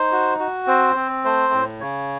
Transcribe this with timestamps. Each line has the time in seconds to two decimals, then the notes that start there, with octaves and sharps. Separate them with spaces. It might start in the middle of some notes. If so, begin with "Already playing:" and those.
Already playing: D#4 C5
0.12 F#4
0.39 F#4
0.67 C4 C5
0.96 C4
1.25 A3 C5
1.53 A2
1.81 C#3 C#5